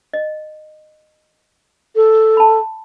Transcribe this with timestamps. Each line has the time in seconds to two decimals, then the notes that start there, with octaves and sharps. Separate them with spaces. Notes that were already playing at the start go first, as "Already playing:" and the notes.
0.13 D#5
1.96 A4
2.37 A5 B5